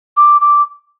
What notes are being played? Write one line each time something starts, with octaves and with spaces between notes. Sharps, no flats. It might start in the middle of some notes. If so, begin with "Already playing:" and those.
D6
D6